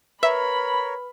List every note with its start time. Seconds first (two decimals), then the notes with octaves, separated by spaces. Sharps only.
0.23 A#4 B4 C#5 E5 B5